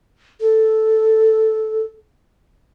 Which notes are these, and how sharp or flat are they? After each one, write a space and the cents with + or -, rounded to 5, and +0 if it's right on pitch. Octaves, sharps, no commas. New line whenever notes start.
A4 -5